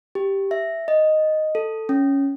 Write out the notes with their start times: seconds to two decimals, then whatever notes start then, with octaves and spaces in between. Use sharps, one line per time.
0.15 G4
0.51 E5
0.88 D#5
1.55 A4
1.89 C#4